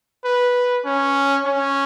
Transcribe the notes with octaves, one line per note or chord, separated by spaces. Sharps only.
B4
C#4
C#4